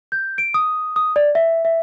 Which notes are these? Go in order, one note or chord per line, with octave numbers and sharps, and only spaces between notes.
G6
D7
D#6
D#6
D5
E5
E5